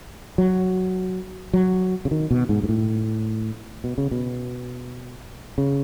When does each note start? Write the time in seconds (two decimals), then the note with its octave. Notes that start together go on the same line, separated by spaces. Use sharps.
0.38 F#3
1.53 F#3
2.05 C#3
2.11 D#3
2.31 B2
2.49 G#2
2.63 G#2
2.69 A2
3.84 B2
3.98 C#3
4.11 B2
5.58 C#3